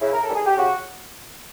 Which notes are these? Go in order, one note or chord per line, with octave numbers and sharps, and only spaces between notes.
C#3 E4
A#4
A4
E3 G3 A#3 C#4
G#4
G4
C#3 F#4